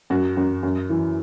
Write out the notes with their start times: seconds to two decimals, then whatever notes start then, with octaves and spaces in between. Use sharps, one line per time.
0.10 F#2 F#4
0.37 F#2
0.63 F#2
0.90 E3